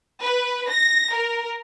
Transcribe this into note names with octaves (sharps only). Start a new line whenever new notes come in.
B4
A#6
A#4